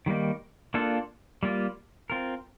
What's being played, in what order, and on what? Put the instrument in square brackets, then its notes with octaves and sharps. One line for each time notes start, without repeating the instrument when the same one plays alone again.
[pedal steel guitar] D#3 G3 A#3 D#4
A#3 D4 F4 A4
G3 A#3 F4
C4 F4 A#4